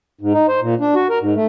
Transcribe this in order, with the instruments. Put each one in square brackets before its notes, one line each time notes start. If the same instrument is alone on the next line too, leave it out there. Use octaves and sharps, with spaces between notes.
[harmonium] G#2
D#4
C5
A#2
D4
F#4
A#4
G#2
A3